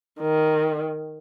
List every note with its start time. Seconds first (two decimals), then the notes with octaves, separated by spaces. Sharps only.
0.20 D#3